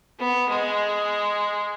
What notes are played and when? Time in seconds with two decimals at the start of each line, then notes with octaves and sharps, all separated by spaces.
0.19 B3
0.49 G#3